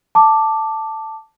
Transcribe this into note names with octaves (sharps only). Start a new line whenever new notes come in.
A5 D6